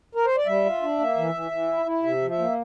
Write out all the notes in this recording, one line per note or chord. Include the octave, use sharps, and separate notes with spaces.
A#4
C5
D5
G3 E5
F4
D4
A#3
E3
E3
E3
E4
E4
C3 E5
F3
E5
A#3